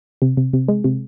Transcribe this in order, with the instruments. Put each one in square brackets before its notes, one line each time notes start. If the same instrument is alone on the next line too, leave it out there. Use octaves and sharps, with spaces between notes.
[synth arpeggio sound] C3
C3
C3
G#3
C3